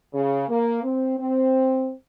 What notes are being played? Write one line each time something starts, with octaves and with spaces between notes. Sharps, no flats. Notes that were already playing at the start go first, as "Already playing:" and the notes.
C#3
A#3
C4
C4